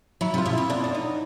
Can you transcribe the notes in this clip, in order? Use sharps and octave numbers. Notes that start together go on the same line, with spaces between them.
F#3 E4
C3
F4
B2
C3 E4
B2 D4
D4
D#4